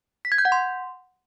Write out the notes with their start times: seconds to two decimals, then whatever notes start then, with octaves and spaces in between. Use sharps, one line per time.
0.25 B6
0.32 G#6
0.38 G6
0.45 F#5
0.52 C6